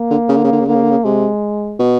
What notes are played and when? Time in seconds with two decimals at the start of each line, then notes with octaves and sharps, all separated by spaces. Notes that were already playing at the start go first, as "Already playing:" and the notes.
Already playing: A#3
0.11 D3
0.29 C#3
0.37 D3
0.44 C#3
0.53 D3
0.60 C#3
0.67 D3 A#3
0.75 C#3
0.83 D3
0.91 C#3
1.04 C3 G#3
1.79 B2